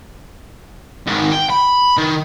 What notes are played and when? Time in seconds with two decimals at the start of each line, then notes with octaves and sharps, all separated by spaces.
1.07 G#2 D#3
1.32 G5
1.50 B5
1.98 D#3